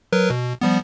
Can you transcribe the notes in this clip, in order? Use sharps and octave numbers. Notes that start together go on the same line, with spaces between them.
F#3 A#4 B4
B2
F3 G3 B3